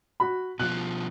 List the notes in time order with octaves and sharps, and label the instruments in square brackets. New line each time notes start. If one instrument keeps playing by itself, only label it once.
[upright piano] F#4 B5
[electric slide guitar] B2 D#3 F3 [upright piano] F#6